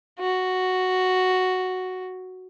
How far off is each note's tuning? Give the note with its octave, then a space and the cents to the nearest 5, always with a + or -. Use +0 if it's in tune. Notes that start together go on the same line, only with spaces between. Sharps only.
F#4 +0